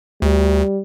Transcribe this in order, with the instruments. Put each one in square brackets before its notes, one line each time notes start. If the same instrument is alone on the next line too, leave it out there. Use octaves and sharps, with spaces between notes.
[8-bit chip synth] D2 [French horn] G3